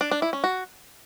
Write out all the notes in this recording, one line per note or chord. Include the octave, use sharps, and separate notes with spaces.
D4
D4
E4
C#4
F#4